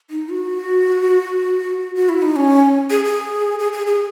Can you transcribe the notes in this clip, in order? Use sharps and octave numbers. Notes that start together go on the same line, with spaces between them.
D#4
F#4
F#4
E4
D#4
C#4
G#4
G#4
G#4
G#4
G#4